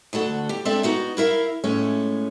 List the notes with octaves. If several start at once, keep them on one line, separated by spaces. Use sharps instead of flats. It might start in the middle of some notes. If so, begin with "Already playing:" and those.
D2 D3 F#4 A4
G4
G#3 C4 D4 A4 D5 E5
B3 D#4 F#4
E4 A#4 E5 F5
A2 G#3 A3 C#4